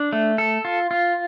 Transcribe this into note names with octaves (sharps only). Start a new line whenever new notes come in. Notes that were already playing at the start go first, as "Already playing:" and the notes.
Already playing: D4
A3
A4
F4
F4